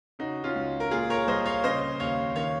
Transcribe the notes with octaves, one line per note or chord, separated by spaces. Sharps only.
C#3 D#4 F#4
C#4 F4
C#2
A#4
A#2 F4 G#4
A#4 C#5
C2 C5 D#5
C#5 F5
C#3 C5 D#5
D#2 C#5 F5
D#3 C#5 F5